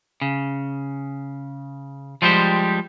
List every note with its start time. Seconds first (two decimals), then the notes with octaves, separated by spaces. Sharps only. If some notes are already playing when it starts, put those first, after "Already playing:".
0.21 C#3
2.22 F3 G3 G#3 G4 C5